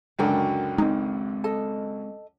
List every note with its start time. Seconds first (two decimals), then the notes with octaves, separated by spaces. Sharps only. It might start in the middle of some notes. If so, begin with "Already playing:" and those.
0.19 C#2 F#2 D3 F#4 A#4 G5
0.78 G#3 C4 D#4
1.44 A4 D#5